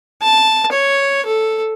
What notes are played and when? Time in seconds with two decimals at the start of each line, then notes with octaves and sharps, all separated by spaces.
0.22 A5
0.72 C#5
1.26 A4